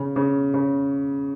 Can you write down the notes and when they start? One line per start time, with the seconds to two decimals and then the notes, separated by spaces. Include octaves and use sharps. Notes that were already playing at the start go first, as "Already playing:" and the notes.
Already playing: C#3
0.16 C#3
0.54 C#3